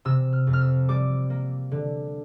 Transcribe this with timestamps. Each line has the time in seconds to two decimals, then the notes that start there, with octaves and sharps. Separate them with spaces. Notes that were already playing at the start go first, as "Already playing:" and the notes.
0.05 C3 E6
0.33 F6
0.47 F2
0.53 F6
0.61 E6
0.88 G3 D6
1.30 A#3
1.71 D3